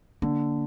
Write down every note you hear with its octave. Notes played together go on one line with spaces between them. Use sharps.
D3 A#3